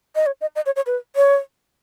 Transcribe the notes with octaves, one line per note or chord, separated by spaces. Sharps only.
D#5
C#5
D#5
D#5
C#5
C#5
B4
C#5